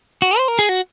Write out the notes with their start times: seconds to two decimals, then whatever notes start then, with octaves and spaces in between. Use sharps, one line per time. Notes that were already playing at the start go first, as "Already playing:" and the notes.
0.22 F#4
0.38 C5
0.48 A#4
0.59 G#4
0.69 F#4